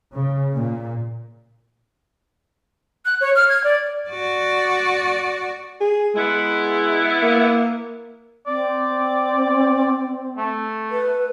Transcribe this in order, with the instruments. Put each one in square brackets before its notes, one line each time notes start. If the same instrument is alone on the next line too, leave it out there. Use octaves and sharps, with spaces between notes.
[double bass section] C#3
A#2
[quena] F#6
C#5
F6
G#6
D5
[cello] F#4 D5
[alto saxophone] G#4
[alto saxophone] G#3 [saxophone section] B3 E4
[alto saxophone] A#3
[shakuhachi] C4 [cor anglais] D5
[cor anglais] A3
[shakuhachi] B4